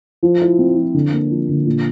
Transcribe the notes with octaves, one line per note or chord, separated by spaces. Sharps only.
F3
E4
C4
F3
D3
A#3
F3
D3
A#2